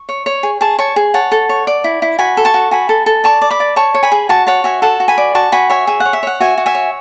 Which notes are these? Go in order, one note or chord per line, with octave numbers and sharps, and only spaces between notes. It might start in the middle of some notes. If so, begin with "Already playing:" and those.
Already playing: C#6
C#5
C#5
G#4
G#4 A5 C#6
C#5 A5 C#6
G#4
C#5 F#5 A5
A4
C#5
D5
E4
E4
F#4 G#5 B5
A4
A5 C#6
F#4
F#4 G#5 B5
A4
A4
D5 A5 C#6
D5
B5 D6
D5
C#5 A5 C#6
C#5
G#5 B5
G#4
F#4 A5 C#6
C#5 F#5 A5
F#4 E5 G#5
A4 F#5 A5
F#4
G#5 B5
D5
F#4 A5 C#6
F#4 G#5 B5
C#5 E5 G#5
G#4 E5
F#5
C#5
E5
C#5 F#5
F#4 E5 G#5
F#4
E5 G#5
C#5